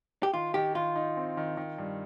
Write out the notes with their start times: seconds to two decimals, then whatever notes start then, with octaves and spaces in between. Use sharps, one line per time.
0.23 G4
0.34 D#3 F4
0.54 D#3 G4
0.75 D#3 F4
0.96 D#4
1.17 C4
1.37 D#3
1.57 D#3
1.78 G2